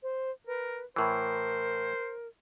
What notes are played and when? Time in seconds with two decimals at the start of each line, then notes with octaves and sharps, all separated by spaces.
0.03 C5
0.47 A#4 B4
0.96 A2 E3 A#4 C5